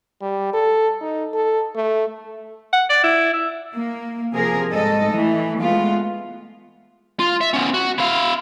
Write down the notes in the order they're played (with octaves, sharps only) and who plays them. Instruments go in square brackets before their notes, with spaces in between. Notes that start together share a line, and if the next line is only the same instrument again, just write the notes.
[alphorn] G3
A4
D#4
A4
A3
[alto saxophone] F#5
D5
E4
E5
[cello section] A#3
C3 F3 G#4 A#4
G#2 G3 A4 D#5
E3 A3
G#3 A3 B3 F4
[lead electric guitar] F4
E5
B3 C#4
F#4
E4 F5